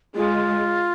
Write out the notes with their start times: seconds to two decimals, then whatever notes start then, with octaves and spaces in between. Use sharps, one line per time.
0.15 G#3 F4